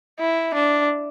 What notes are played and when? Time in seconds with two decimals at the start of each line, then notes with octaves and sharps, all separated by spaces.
0.20 E4
0.54 D4